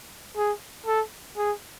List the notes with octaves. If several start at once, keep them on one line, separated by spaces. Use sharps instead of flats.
G#4
A4
G#4